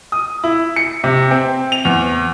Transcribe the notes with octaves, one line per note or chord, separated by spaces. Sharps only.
D#6
E4
C#7
C3
C4
F7
E2